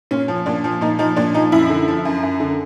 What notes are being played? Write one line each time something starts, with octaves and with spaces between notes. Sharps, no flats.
A#2 C#4
F3
A#2 D4
F3
A#2 D#4
F3 D#4
A#2 D4
F3 D#4
F#2 E4
D3
F3
F#2
F#2
D3